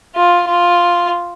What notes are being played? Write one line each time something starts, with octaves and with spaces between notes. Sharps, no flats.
F4
F4